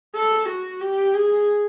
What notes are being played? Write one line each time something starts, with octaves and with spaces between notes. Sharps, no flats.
A4
F#4
G4
G#4